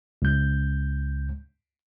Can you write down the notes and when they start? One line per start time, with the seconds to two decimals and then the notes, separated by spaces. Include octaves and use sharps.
0.22 C#2 G6